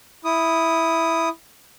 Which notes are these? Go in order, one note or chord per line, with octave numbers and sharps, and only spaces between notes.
E4 D#6